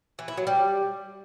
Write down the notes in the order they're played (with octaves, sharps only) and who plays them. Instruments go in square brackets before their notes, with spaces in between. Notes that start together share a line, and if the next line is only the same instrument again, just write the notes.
[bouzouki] E3
E4
F#3
G3